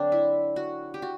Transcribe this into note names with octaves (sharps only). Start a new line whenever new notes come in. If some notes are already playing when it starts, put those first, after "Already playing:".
Already playing: D3 F#3 C4 D4
E4
F#4
G4
F#4